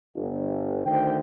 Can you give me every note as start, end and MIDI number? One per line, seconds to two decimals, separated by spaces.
0.16 0.85 31
0.86 1.17 38
0.86 1.17 51
0.86 1.17 72
0.86 1.17 79